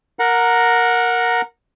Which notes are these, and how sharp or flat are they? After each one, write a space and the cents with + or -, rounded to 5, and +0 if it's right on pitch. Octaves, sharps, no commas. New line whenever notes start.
A#4 +0 F#5 -15 A#5 +0